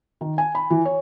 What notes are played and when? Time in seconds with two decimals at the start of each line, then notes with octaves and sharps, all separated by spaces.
0.21 D#3
0.38 G#5
0.55 B5
0.70 E3
0.85 C#5